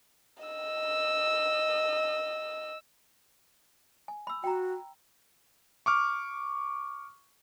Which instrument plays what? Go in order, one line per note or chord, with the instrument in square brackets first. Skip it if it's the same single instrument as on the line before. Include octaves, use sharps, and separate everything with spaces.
[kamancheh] D#5 E6
[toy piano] G#5
B5 E6
[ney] F#4 [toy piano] G5 A#5
[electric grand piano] C#6 D6 F6